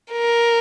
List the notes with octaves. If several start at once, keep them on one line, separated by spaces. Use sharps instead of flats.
A#4